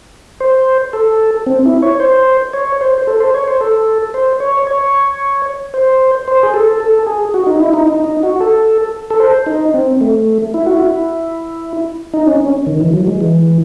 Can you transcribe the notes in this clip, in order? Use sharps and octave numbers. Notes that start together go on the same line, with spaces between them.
C5
A4
C4
E4
C#5
C5
C#5
C5
C5
A4
C5
C#5
C5
A4
C5
C#5
C#5
C5
C5
G#4
A4
A4
G#4
F#4
D#4
E4
D#4
D#4
D#4
F#4
A4
A4
C5
D#4
C4
A3
E4
F#4
E4
D#4
C#4
C#4
D#3
E3
F#3
G#3
E3